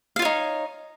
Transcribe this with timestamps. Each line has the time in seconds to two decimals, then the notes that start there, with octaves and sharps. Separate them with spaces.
0.16 F5
0.19 F4
0.22 C#5
0.25 D#4